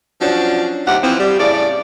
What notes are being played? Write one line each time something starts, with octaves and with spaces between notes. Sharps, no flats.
F3 F#3 C#4 D4
D#2 C3 G3 F#5
E3 F3 C4
G3
A2 C#3 D5